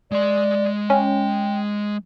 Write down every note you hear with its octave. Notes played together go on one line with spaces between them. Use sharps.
G#3 D5 C6
C#4 G5